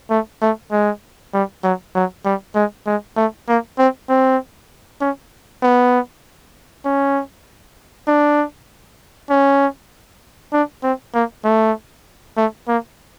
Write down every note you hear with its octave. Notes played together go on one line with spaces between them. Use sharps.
A3
A3
G#3
G3
F#3
F#3
G3
G#3
G#3
A3
A#3
C4
C4
C#4
B3
C#4
D4
C#4
D4
C4
A#3
A3
A3
A#3